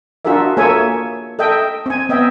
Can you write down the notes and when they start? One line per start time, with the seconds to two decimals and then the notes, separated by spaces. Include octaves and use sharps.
0.25 D4 F4 F#4 G#4 A#4 E5
0.57 A#3 G#4 A4 C#5 E5 G#5
1.39 A4 D#5 E5 G5
1.86 C4 G#5
2.09 B3 D#5 E5 G5